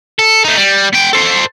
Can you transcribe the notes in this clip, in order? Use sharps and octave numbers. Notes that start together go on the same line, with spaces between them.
A4
A3 D#4
G3
B3 G5
A4 C5